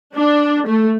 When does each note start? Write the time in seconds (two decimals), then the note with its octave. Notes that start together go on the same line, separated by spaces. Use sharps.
0.14 D4
0.67 A3